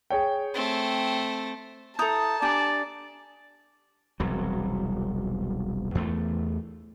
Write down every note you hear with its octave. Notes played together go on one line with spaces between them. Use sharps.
G#4 C#5 G5
A3 C4
E4 A4 A5 A#5 D#6 G6
D4 G4 D5 G#5
E1 C2 F#3
E2 A3